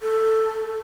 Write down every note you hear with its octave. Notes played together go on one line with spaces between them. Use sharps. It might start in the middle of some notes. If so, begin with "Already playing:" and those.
A4